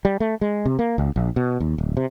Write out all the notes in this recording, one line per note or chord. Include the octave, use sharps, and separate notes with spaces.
G3
A3
G#3
C3
A#3
C#2
A#1
B2
D#2
D1
C3